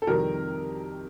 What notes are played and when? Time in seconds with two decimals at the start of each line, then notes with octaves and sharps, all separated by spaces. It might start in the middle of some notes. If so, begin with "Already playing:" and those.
0.02 A4
0.07 F2 C3 D#3 G3 A#4